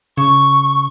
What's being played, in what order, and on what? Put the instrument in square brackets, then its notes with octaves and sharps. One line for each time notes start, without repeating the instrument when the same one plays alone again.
[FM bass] C#3 [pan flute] C#6